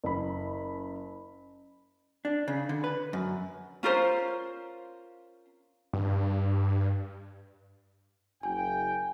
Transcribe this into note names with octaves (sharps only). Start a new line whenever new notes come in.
F#1 B5
D4
C#3
D3
B4
F#2
C#4 F4 A#4 C5
G2
F#1 G5 G#5